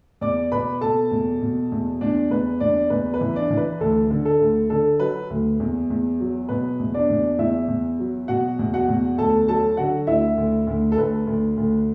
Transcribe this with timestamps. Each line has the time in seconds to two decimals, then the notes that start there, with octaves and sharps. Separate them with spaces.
0.21 E2 D5 D6
0.52 B2 B4 B5
0.81 B2 A4 A5
1.11 E2
1.41 B2
1.72 E2
2.01 E2 D4 D5
2.30 E2 B4
2.60 E2 D4 D5
2.90 E2 B4
3.14 B4
3.21 E3
3.36 D4 D5
3.50 E3
3.57 B4
3.80 D2 A4
4.10 D3
4.25 A4
4.40 D2
4.70 D3 A4
4.99 F#3 B4
5.30 D2
5.60 E2
5.90 E2
6.20 F#3
6.49 B2 B4
6.79 E2
6.94 D4 D5
7.10 E2
7.39 E2 E4 E5
7.68 E2
7.99 F#3
8.28 B2 F#4 F#5
8.59 E2
8.73 F#4 F#5
8.88 E2
9.17 D2 A4 A5
9.48 F#3 A4 A5
9.77 D3 F#4 F#5
10.07 D2 E4 E5
10.37 D2
10.67 D2
10.92 A4
10.98 D2 B4
11.27 D2
11.57 D2